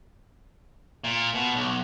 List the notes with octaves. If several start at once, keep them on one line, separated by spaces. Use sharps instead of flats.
A#2
B2
B1